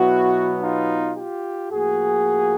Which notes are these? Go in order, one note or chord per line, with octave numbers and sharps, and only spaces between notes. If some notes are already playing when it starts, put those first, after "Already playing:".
Already playing: B2 F#3 B3 E4 F#4
D#4 F4
F4 G4
A2 F3 A#3 F#4 G#4